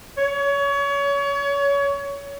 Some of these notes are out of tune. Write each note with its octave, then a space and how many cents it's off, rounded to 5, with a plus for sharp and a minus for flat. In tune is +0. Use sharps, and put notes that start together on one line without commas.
C#5 +25